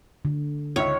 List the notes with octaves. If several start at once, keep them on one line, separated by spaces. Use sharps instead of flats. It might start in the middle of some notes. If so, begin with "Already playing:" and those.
D3
C#2 D#4 C#5 E5